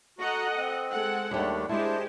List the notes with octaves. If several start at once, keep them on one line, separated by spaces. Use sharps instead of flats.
F#4 A4 D#5 F#5 A#5
C4
G#3 A4 F#5
D#2 D#3 G3 A3 D4
G#3 D4 E4 G4 C5 A5